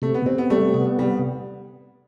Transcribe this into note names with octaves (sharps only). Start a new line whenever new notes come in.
C3 A3
B3
C3 C4
B3
G3 A3
B3
C3 G3